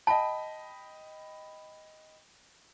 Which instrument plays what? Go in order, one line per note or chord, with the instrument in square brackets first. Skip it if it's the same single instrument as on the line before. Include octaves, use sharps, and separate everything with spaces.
[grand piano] D#5 G5 B5 [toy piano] A5